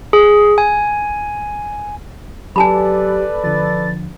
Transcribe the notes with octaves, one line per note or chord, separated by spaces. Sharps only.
G#4
G#5
F#3 G4 A4 B4 D5 G#5 A5 B5
D3 F3 A6